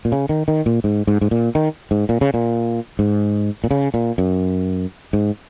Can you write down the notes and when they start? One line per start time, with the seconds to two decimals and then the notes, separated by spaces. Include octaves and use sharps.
0.05 A#2
0.12 C#3
0.29 D#3
0.48 D#3
0.66 A#2
0.84 G#2
1.07 G#2
1.21 G#2
1.31 A#2
1.55 D#3
1.91 G#2
2.09 A#2
2.21 C#3
2.34 A#2
2.99 G#2
3.64 A#2
3.71 C#3
3.94 A#2
4.18 F#2
5.13 G#2